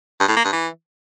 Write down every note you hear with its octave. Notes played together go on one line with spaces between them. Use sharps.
G2
A2
A#3
G2
E3